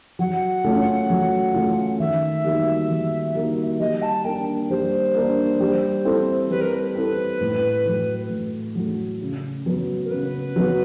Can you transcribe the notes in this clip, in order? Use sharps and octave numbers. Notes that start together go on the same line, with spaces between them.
F#3 F#5
A3 C#4 F4
F#3
A3 C#4 F4
D#3 E5
G3 A#3 D#4 F#4
D#3
G3 A#3 D#4 F#4
G3 D#5
A5
A#3 D4 G5
G3 C5
A#3 D4
G3
C4 E4 A4
G3 B4
A#4
B4
C4 E4 A4
A2
F#3 A3
A2
F#3 A3
C#3
F#3 B3
A#4
C#3 B4
F#3 B3